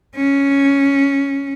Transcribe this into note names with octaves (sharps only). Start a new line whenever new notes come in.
C#4